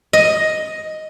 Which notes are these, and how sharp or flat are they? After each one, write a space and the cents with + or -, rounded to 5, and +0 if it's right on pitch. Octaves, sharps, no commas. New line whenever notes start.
D#5 +5